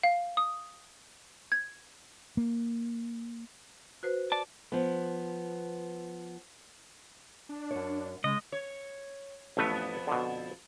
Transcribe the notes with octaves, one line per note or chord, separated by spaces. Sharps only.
F5
D#6
G#6
A#3
F#4 B4 C5
D5 A5
F3 B3
D4
F#2 C#5
C#3 G#3 D#5
C#5
A1 F2 A3 B3 B4
B2 D3